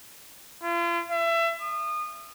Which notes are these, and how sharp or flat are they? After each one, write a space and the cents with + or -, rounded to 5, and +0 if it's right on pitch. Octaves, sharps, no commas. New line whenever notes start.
F4 -40
E5 +25
D#6 -30